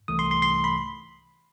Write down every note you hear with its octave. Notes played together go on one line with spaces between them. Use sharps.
C2 C3 E3 A3 D#6
C6
C6
C6
B5